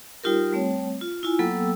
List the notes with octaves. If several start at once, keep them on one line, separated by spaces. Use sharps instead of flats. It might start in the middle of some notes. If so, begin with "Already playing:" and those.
G3 D#4 F4 G4 A#4
G3 A3 C4 C#5
F4
E4 F4 G#5
F#3 A#3 B3 A4 G5 E6